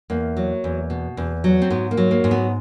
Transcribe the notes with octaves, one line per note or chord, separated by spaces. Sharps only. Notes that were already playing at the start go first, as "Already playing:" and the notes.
E2 A#3
F#3
E2
B2
E2
F#3
C4
G#2 B3
A#3
F#3
A#3
G#2
B3